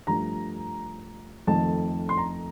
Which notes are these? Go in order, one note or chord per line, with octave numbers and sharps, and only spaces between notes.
G2 F3 A3 A#5
F2 D#3 A3 A5
C6
A#5